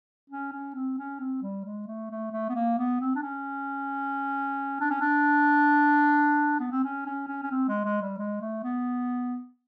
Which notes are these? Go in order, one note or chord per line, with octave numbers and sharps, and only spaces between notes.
C#4
C#4
C4
C#4
C4
G3
G#3
A3
A3
A3
B3
A#3
B3
C4
D4
C#4
D4
C#4
D4
B3
C4
C#4
C#4
C#4
C#4
C4
G#3
G#3
G3
G#3
A3
B3